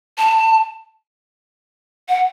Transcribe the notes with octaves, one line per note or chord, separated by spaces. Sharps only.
A5
F#5